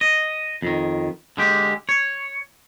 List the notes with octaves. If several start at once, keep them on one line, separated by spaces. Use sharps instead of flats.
D#5
F2 D#3
D3 G#3 G4
C#5